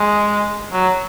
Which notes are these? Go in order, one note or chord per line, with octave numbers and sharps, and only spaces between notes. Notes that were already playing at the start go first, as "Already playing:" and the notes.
Already playing: G#3
F#3